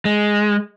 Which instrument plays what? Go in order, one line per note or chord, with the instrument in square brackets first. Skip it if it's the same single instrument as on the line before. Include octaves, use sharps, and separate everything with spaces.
[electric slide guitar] G#3